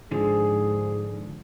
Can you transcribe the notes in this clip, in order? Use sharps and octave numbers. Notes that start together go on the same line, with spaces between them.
G#2 D3 F3 C4 G#4